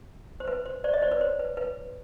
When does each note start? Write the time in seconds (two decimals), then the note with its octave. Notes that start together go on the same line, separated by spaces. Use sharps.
0.40 C5
0.47 B4
0.65 C5
0.84 C5 D5
0.93 C#5 D#5
1.02 C5 D5
1.11 B4 C#5
1.21 C5
1.39 B4
1.57 B4